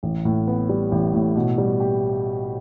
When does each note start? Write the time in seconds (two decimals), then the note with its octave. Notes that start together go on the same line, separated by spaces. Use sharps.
0.03 A1
0.25 A2
0.47 B3
0.69 G3
0.92 A1
1.14 A2
1.36 B2
1.58 G3
1.80 G4